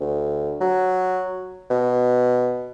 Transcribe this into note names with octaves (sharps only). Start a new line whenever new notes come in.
D2
F#3
B2